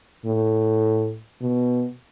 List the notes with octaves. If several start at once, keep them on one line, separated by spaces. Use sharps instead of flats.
A2
B2